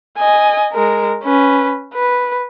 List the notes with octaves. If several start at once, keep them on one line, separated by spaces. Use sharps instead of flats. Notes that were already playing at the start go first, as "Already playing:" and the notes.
D#5 G#5
G#3 A#4
C#4 B4
B4